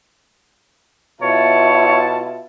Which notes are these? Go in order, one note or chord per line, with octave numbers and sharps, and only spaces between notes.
B2 E4 F4 C#5 A5